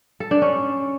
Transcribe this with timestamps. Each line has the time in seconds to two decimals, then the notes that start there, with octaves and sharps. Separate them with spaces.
0.20 A4
0.31 D4
0.42 C#4